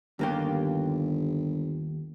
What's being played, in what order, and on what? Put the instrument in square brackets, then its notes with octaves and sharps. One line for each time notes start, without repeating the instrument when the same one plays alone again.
[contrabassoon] G1 [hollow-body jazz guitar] D#2 A#3 G4